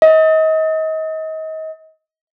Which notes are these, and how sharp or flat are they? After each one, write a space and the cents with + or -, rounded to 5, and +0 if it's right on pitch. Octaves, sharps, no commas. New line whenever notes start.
D#5 +30